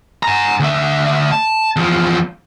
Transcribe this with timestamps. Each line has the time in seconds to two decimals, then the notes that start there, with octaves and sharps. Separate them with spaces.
0.23 G#5 A#5
0.60 D2 E5
1.32 A5
1.76 E2 F3